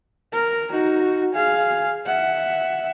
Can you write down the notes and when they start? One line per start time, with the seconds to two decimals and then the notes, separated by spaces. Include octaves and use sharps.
0.33 A#4
0.71 D#4 F#4
1.33 G#4 F5
2.06 E5 F#5